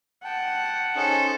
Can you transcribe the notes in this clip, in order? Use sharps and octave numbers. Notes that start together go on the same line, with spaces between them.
F#5 G5 A5
C#4 D#4 G#4 A4 C5